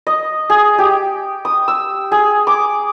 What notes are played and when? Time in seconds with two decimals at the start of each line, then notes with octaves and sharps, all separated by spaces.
0.07 D#5
0.50 G#4
0.78 G4
1.45 D#6
1.68 E6
2.12 G#4
2.47 D6